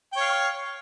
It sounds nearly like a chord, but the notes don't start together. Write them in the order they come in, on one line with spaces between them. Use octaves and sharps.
G5 C#5 F5